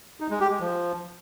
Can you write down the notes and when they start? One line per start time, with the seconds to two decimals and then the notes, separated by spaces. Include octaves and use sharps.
0.20 D#4
0.30 G#3
0.40 G4
0.50 G#3
0.60 F3